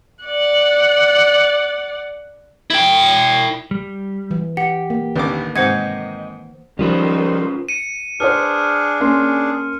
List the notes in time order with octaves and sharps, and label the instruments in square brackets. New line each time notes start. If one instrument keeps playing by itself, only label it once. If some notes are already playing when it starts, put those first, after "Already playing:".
[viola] D5 F#5
[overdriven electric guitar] E4 G5
[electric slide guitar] G3
[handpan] E3
[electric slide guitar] G4 [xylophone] F#5
[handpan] A#3
[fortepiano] A1 D2 D6 [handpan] D#3 B4
[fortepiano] G#2 C3 [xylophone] C5 F#5 G#6 [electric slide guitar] D#5
[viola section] D#3 D#4 C5 [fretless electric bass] F3 G3 [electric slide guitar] C#4 F4 B4
[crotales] C#7 D#7
[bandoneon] D4 G#4 [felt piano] B4 C5 [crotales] F6
[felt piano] A#3 C#4 C6